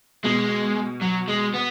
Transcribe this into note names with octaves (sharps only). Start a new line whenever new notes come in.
B2 G#3
F#3
G#3
B3